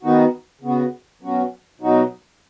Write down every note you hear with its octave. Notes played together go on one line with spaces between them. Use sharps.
D#3 B3 D#4 F#4
C#3 B3 F#4
B2 F#3 C#4 F#4
B2 F#3 D#4 F#4